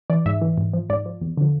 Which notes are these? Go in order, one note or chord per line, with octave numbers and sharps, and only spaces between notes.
E3 D5
G#2 E5
E3
G#2
F3
G#2 D5
F3
E2
D3 F3